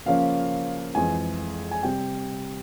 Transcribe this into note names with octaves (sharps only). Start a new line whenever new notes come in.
C#3 F3 A#3 C#4 F5
F2 E3 G#3 G#5
G#5
C3 G3 C4 G5